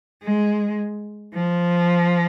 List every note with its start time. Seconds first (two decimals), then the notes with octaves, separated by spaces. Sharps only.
0.23 G#3
1.34 F3